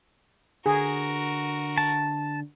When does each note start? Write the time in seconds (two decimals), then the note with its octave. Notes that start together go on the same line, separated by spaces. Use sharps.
0.66 D3 F#4 G#4 A#4
1.78 A5